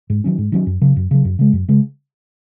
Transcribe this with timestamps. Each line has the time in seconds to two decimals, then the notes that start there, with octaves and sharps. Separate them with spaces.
0.10 G#2
0.24 D#3 F#3 C#4
0.38 G#2
0.52 D#3 F#3 C#4
0.67 F#2
0.82 C#3 F#3
0.96 F#2
1.11 C#3 F#3
1.25 F#2
1.39 C#3 G#3
1.53 F#2
1.68 C#3 G#3